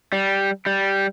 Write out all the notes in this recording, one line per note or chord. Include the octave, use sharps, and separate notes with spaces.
G3
G3